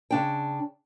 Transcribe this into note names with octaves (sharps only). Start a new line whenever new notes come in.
C#3 D4 G5